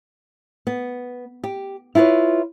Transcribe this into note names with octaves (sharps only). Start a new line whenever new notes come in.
B3
G4
E4 F4 G4 B4 C#5